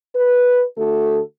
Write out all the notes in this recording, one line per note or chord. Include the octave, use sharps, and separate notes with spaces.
B4
D3 A3 F#4 A4